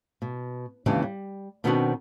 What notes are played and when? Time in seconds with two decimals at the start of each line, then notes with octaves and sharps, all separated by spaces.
0.22 B2
0.86 D#2 C#3 E3 G#3 D4 G4
1.02 G3
1.64 B2 D#3 B3 C4 D4 F#4